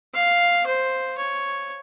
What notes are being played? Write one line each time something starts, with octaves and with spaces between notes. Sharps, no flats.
F5
C5
C#5